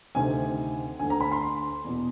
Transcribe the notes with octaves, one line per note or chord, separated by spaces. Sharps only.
D2 C3 D#3 G#5
D2 D3 G#5
A#5
B5
C6
C6
E2 B2